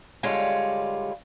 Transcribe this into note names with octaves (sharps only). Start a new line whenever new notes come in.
D3 G3 G#3 F4 C#5